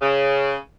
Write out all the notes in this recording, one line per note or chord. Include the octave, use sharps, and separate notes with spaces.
C#3